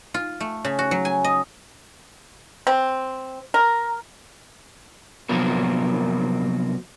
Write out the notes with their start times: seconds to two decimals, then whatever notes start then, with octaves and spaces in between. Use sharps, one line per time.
0.14 F4
0.40 A3
0.65 C#3
0.79 F#4
0.91 F#3
1.05 G#5
1.24 D#5
2.67 C4
3.54 A#4
5.29 C3 F3 F#3 A#3 B3 A#4